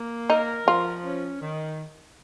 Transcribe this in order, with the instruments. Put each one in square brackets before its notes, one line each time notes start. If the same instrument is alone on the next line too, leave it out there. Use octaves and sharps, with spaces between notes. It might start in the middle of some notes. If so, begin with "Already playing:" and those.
Already playing: [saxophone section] A#3
[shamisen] D#4 [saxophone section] A#4
[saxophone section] F3 [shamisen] F4
[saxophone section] C#4
D#3